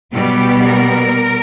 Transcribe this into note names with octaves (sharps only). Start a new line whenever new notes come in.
B2 G3 B3 G4
A#4